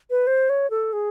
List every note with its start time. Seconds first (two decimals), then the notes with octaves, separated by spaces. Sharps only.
0.10 B4
0.27 C5
0.49 C#5
0.70 A4
0.93 G#4